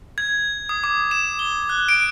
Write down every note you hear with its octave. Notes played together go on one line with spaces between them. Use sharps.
G#6
D#6
D6
E7
G7
F#6
D7